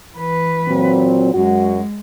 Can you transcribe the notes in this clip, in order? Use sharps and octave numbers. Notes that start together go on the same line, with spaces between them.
E3 B4
A#2 F#3 C4
F#2 G#3 F#4